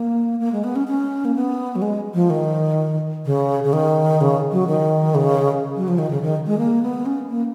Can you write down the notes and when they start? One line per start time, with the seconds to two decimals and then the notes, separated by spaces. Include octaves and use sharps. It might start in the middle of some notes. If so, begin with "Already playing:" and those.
Already playing: A#3
0.39 A#3
0.52 G#3
0.64 B3
0.76 C#4
0.87 C#4
1.25 A#3
1.36 B3
1.76 F#3
1.82 G#3
2.14 F3
2.30 D#3
3.25 C#3
3.64 C#3
3.73 D#3
4.21 C#3
4.52 F#3
4.67 D#3
5.15 C#3
5.76 F#3
5.88 F3
5.99 D#3
6.11 C#3
6.22 D#3
6.46 G#3
6.58 A#3
6.82 B3
7.06 C#4
7.29 A#3